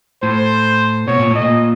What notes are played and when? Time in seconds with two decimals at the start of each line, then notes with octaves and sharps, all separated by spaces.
0.23 A2 C5
1.08 B2 C#5
1.19 A#2
1.31 A2 D#5
1.42 A#2